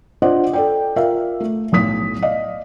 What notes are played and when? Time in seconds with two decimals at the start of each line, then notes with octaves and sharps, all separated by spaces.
0.22 D4 F4 C5 D5 D#5 F#5
0.53 A4 D5 G5
0.96 F4 A#4 D5 E5 F5
1.40 A3
1.72 B1 A2 D#6 B6
2.22 D5 D#5 F5